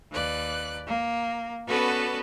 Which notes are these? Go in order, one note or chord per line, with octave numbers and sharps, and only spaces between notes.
D#2 B4 D5 F#6
A#3
B3 C#4 F#4 A4 B4 D5